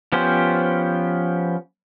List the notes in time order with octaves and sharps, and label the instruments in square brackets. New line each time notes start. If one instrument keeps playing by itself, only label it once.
[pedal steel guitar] F3 B3 C#4 G4 C5